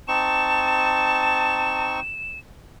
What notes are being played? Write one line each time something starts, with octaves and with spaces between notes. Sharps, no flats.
C4 D#4 A5 C#6 E7